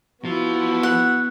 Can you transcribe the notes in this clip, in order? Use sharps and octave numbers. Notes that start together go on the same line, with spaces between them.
F3 B3 E4 F#4
F#5